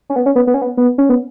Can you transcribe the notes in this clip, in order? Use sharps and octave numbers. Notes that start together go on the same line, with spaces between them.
C#4
B3
C#4
B3
B3
C#4
B3
B3
C#4
B3